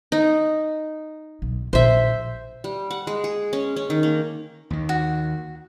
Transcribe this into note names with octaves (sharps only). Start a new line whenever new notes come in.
D#4
B1
A#1 C5 E5
G3
F#5
G#3
G#4
C#4
C#4
D#3
A#3
D#2 D#3
F#4